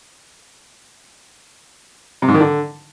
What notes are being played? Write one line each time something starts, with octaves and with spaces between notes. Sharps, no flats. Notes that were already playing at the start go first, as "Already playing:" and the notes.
C3
G#2
D#3
D3